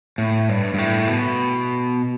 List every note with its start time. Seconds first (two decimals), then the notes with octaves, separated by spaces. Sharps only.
0.18 A2
0.49 G2
0.74 G2
0.78 A2
1.07 B2